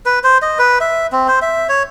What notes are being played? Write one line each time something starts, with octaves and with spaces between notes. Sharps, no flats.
B4
C5
D#5
B4
E5
C4
C5
E5
C#5